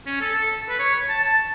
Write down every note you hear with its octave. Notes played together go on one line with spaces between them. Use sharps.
C#4
A4
A4
B4
C#5
A5
A5